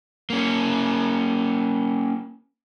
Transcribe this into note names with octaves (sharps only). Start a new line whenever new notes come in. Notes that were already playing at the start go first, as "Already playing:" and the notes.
A#3 C#4